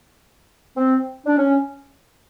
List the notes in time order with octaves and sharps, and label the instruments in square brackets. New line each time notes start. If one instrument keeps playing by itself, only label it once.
[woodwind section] C4
D4
C#4